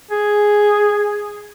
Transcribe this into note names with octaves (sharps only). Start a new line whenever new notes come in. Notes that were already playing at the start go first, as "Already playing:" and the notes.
G#4